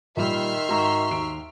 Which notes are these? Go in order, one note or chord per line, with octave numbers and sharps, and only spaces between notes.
A#2 D#3 G3 E5 C6 F6
G#2 F#4 A#5 C#6
D#2 D7